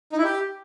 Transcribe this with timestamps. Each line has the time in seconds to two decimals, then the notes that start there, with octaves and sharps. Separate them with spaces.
0.12 D#4
0.18 E4
0.24 G4